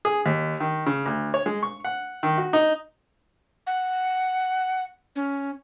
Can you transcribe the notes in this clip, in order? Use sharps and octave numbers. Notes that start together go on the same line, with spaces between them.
G#4
D#2
D#3
C#3
D2
C#5
G#3
C#6
F#5
D#3
F#4
D#4
F#5
C#4